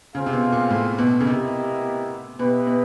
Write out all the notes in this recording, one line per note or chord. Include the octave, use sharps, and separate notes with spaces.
C#3 C4 F4 G#4 C5 F5
C3
B2
A#2
A2
B2
C#3
C3 B3 E4 G4 A#4 D#5
B2 E4 G4 B4 D#5
B2